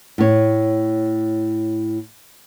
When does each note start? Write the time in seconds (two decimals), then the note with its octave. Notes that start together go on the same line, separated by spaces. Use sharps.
0.18 A2 C#5